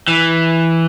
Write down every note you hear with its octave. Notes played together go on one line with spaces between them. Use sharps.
E3